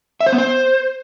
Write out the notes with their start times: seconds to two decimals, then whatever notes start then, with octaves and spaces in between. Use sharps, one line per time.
0.21 E5
0.26 C5
0.32 B3
0.38 C5